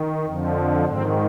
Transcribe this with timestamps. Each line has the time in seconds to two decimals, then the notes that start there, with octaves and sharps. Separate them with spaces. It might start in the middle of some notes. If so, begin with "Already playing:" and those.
Already playing: D#3
0.25 F2 D3 F3
0.85 G#2 D#3 C4